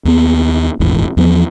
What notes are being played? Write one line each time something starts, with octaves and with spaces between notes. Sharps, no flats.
D#2 B3
D#1 G#1 E2
E2 F3 B3